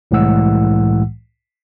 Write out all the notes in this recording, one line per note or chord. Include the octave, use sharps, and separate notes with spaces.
C2 A2 E3 G#3 F#5 E6